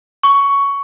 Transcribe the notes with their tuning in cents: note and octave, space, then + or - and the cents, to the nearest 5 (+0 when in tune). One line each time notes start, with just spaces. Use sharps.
C#6 +10